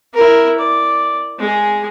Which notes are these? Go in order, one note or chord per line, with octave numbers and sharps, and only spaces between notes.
E4 A#4
D5
G#3 G#4